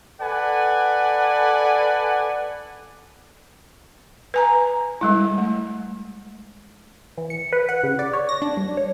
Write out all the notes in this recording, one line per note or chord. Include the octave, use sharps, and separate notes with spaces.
A4 B4 D5 F#5 G#5
B4 G#5 A#5
G3 G#3 E4
A3
E3
C#7
B4
F#5
C#3
D5
C#5
A#6
D4
G2
C#5